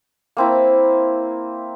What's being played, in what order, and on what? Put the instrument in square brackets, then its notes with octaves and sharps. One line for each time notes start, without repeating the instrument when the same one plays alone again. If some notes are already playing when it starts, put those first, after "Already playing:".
[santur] A#3 C4 E4